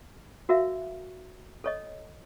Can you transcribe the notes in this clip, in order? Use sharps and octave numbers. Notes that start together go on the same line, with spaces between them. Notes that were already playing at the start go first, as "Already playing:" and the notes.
F#4 A#4 E5 F5
A4 C#5 D#5